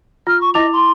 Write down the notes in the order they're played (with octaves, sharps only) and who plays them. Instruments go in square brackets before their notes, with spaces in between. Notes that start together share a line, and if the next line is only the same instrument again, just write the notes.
[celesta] F4 [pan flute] F6
[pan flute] C#6
[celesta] E4 D6 F7 [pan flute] D#5
[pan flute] C6